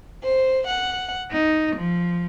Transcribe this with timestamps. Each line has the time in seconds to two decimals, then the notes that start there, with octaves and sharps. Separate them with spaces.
0.21 C5
0.66 F#5
1.30 D#4
1.76 F3